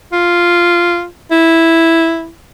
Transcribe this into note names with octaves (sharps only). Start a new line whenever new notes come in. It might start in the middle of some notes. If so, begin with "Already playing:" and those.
F4
E4